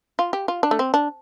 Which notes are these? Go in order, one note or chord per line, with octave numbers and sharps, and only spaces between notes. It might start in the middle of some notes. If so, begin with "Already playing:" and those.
F4
G4
F4
D4
A3
C4
D4